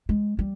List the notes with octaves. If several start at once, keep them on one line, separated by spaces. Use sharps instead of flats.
G#3
G3